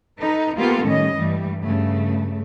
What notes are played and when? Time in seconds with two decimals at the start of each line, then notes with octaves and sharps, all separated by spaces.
0.19 D#4 A4 B4
0.56 A#3 B3 F4 G4 A4 A#4
0.85 A2 D#3 G3 C#4 D#5
1.16 G2 E3 G3 A3
1.61 G2 C#3 A3